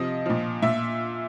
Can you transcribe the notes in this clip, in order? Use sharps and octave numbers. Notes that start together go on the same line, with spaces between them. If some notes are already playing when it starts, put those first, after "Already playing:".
Already playing: C3 F3 D#5
A#2 F3
A#2 E5